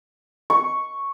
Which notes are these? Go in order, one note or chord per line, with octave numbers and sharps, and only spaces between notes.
C#6